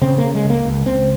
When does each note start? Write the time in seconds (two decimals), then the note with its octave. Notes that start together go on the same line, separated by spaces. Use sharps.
0.01 C#3 C4
0.18 A#3
0.24 C#3
0.34 G#3
0.45 C#2
0.50 A#3
0.65 C#2
0.86 C#2 C4